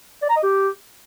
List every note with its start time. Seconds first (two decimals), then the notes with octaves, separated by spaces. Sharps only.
0.22 D5
0.29 A#5
0.36 D#5
0.43 G4